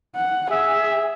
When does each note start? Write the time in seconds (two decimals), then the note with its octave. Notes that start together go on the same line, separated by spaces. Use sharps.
0.16 F#5
0.51 G#4 E5